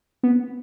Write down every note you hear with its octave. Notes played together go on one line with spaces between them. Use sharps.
B3